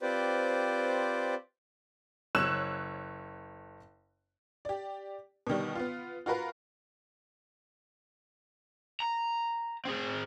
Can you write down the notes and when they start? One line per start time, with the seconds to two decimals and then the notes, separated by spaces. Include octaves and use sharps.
0.02 C4 F4 G4 B4 C5 D5
2.35 F#1 C#5 E6 F#6 E7
4.65 G4 D5
5.47 B2 D3 D#3 G3
5.75 B3 F4
6.26 F4 F#4 A#4 B4 F5
9.00 A#5
9.85 C4 G#4